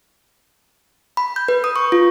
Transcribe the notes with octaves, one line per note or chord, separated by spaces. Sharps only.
B5
G6
B4
D#6
C#6
F4